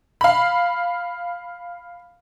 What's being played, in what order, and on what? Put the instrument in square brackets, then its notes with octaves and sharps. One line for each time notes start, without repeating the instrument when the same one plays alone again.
[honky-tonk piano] F5 B5